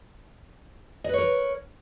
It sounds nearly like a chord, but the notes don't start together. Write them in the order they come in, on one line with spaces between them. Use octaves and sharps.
D#5 B4 C#5 A#4